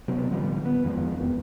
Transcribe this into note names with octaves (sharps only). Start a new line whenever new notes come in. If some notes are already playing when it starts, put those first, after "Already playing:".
C3 F#3 B3
A2 D3 F3 G3
B3
F2 D#3 F3 G#3
E1 B3